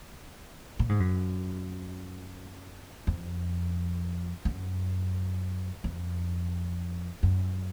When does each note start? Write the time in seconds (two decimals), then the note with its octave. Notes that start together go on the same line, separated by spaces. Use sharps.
0.79 A#2
0.89 G#2
1.00 F#2
3.07 F2
4.45 F#2
5.84 F2
7.23 F#2